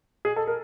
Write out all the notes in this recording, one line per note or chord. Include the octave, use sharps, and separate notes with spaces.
G#4
A4
A#4